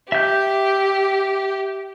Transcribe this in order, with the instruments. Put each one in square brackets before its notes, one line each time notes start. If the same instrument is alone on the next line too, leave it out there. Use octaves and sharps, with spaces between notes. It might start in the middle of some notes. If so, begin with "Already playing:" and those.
[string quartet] G4 [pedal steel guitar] E5 G6